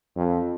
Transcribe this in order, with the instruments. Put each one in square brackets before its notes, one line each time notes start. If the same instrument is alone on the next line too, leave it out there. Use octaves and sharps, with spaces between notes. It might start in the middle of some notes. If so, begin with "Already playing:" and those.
[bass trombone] F2